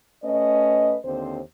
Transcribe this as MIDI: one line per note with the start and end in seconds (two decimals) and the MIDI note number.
0.24 0.97 57
0.24 0.97 61
0.24 0.97 71
0.24 0.97 75
1.05 1.39 39
1.05 1.39 50
1.05 1.39 60
1.05 1.39 72